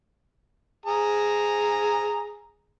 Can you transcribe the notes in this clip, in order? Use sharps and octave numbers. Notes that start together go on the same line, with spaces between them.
G#4 A#5